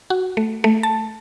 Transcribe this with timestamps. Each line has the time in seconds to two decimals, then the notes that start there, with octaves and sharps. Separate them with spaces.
0.10 F#4
0.37 A3
0.64 A3
0.83 A5